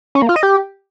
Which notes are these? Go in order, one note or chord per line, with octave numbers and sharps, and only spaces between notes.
C#4
A#3
F4
D#5
G4